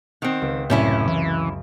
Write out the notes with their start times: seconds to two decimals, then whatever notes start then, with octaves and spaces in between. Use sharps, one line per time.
0.22 D#3 C4 F#5 D7
0.42 C#2
0.70 F#2 A2 C3 C#4 E4
1.08 E3